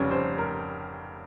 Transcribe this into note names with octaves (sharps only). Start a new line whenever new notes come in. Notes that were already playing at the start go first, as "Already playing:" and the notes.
Already playing: F1 F2 C#3 G3 C#5
C5
A#4